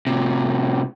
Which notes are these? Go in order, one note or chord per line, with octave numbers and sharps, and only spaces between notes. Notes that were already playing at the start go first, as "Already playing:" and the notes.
A2 C3